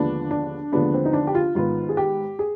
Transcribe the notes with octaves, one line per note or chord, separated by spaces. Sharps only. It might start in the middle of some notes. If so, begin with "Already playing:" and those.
Already playing: D#2 D3 F3 G#3 B3 D4
D4
D#2 D3 F3 G#3 B3 D4
C4
D#4
D4
G4
F4
G#2 D#3 B3 F4
G#4
G4
G#4